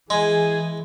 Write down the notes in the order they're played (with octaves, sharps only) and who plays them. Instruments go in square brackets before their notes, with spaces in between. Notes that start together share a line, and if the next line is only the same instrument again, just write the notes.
[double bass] E3 [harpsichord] G#3 [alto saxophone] G#4